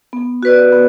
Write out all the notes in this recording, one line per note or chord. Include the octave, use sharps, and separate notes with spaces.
B3
F#4 B4 D5
B3